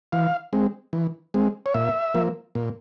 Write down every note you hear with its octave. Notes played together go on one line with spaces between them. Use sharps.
E3 F5
G#3 C4
E3
G#3 C4
C#5
A#2 E5
F3 A#3
A#2